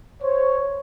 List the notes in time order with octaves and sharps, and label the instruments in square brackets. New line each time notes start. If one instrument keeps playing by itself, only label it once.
[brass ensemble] C5 C#5